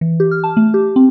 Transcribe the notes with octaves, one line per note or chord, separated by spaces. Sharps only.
E3
G4
F6
A5
A3
G4
C4